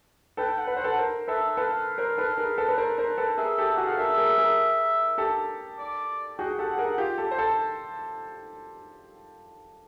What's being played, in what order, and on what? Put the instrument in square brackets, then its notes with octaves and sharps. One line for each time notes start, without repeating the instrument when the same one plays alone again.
[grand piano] A4 B4 [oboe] G5
[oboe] G5
F#5
[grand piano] B4
[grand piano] C5 [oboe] F#5
[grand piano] A4 B4
A#4 C5
[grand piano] A4 B4 [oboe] E5
[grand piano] A4 B4 [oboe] F5
[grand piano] A#4 C5
A4 B4
G#4 A#4
A4 B4
B4
A#4 C5
A#4 C5
A4 B4
[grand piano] G#4 A#4 [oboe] E5
[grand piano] G4 A4
[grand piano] F#4 G#4 [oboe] F#5
[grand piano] A4 [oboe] F5
[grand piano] G#4 A#4 [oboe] E5
[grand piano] G#4 A#4
G#4 A#4
G4 A4
[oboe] D5
[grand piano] F#4 G#4 [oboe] G5
[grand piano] G4 A4 [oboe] F#5
[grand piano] G#4 A#4 [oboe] F#5
[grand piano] F4 G4
G4 A4
C5
A4